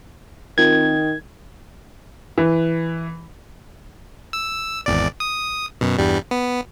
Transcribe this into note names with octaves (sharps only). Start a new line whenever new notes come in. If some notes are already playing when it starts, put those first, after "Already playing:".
D#3 C4 F4 A#4 G#6
E3
E6
G#1 E2 D5
D#6
F#2 B2
E2 G2 G3
B3